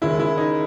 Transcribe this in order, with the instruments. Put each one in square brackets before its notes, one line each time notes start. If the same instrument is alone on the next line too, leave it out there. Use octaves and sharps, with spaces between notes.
[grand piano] D#2 C#3 G#3 [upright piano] E4
[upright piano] E4
D#4